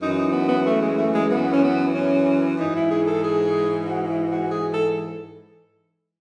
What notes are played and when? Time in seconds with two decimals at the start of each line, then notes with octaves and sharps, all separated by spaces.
0.01 F#2 E3 D#4
0.17 D#4
0.32 B3
0.48 B3
0.65 A3
0.82 G#3
0.97 A3
1.14 G#3
1.30 B3
1.52 C#4
1.62 B3
1.93 C#4
2.58 G#2 E3 D#4
2.74 E4
2.91 G#4
3.07 A4
3.23 G#4
3.87 F#4
4.08 E4
4.30 F#4
4.51 G#4
4.73 A4